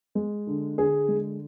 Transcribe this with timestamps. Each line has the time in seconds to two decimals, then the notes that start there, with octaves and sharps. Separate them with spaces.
0.15 G#3
0.47 D3
0.77 D3 G#4
1.08 G#3